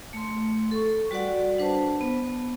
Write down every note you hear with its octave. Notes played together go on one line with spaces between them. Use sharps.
A3 C6
A4 C#6
G3 F#4 B4 D5 F#5
D4 B4 C5 A5
B3